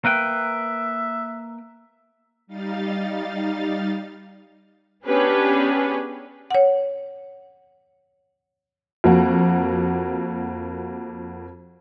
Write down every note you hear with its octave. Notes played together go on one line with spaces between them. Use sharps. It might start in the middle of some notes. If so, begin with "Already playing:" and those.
A#3 B4 E5 G5
G3 D#4 F5 A6
B3 C#4 D4 G4 G#4 B4
C#5 F#5
F2 A#3 F#4